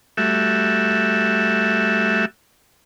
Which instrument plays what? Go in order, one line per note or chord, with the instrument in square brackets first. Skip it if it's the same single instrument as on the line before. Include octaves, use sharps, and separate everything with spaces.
[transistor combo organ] G3 A3 F#4 E5